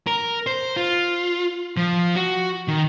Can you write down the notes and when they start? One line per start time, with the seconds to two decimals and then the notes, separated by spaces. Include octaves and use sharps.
0.07 A#4
0.47 C5
0.77 F4
1.77 F3
2.16 F#4
2.68 D#3